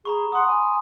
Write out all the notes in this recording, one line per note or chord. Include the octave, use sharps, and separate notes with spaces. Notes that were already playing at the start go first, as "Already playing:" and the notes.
G#4 A#5 B5 C#6
F#5 C6 D#6
G#5